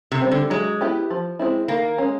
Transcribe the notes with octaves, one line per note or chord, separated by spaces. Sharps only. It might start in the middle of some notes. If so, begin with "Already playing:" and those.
C3
G3 C4
D3
F#3 G#3
B3 E4 G4
F3
G#3 C4 E4
D#3 A#3
G#3 C#4